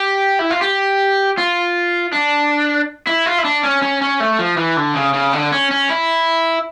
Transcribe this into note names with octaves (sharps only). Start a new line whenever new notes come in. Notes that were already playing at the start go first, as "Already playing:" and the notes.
Already playing: G4
E4
F4
G4
F4
D4
E4
F4
E4
D4
C#4
C#4
C#4
A3
F3
E3
D3
C#3
C#3
D3
C#4
C#4
E4